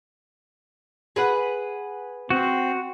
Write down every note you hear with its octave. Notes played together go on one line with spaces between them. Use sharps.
G#4 B4 F#5
C4 F#4